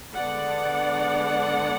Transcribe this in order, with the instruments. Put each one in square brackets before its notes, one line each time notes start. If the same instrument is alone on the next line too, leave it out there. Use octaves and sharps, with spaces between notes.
[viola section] D3 G#3 B3 D4 D5 F#5